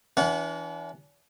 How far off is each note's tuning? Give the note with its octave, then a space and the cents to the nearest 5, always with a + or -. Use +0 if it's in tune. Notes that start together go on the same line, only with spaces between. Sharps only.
E3 +0 D4 -45 F#5 +0